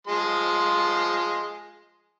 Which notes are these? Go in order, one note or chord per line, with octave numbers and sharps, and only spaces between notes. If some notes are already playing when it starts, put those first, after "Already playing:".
F3 G#3 C6